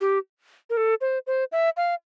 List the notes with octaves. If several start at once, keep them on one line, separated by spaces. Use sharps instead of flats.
G4
A#4
A4
C5
C5
E5
F5